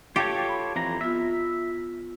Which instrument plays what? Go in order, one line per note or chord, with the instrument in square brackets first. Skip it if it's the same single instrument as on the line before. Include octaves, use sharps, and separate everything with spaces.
[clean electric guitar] F4 A4 C#5 [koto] G4
[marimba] B5
[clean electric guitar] F2 E3 A#5
[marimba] B3 F4 [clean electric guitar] E5